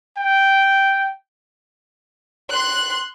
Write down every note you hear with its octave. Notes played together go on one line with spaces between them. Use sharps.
G5
C6 F#6